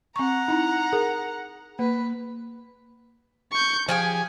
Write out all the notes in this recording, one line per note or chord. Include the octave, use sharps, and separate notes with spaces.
C4 F#5 A#5 C#6
D#4 E4
G#4 A#4
A#3 B4
C#6 G6
F3 G4 G#4 G#5